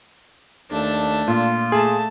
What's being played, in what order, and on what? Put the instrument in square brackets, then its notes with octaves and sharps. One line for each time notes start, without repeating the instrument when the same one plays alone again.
[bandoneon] D#2 [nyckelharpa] A3 D4
[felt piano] A#2 [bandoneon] F4
[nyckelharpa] A3 A5 [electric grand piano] G#4